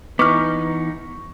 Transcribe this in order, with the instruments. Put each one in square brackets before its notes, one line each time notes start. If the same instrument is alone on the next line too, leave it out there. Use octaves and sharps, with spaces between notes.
[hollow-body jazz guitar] E3 B3 [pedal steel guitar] D#4 [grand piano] C#6 [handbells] D6 F6